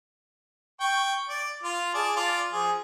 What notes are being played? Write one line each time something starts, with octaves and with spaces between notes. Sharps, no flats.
G5 C#6
D5
F4
G#4 D5 A5
F4 D5
F3 G#4